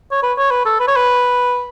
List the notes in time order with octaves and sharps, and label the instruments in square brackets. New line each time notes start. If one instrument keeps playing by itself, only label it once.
[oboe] C#5
B4
C#5
B4
A4
B4
C#5
B4